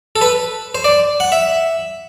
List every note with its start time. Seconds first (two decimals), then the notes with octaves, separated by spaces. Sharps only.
0.16 A4
0.21 B4
0.75 C5
0.84 D5
1.20 F#5
1.32 E5